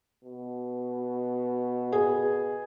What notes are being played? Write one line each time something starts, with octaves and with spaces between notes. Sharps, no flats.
B2
G#4